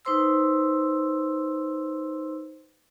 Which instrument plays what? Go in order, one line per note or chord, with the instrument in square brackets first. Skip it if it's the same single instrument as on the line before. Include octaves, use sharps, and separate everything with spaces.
[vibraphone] D#4 B4 C5 C6 E6